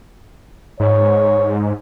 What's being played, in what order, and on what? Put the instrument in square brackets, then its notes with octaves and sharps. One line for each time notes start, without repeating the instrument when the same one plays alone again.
[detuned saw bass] G#2 [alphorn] C#5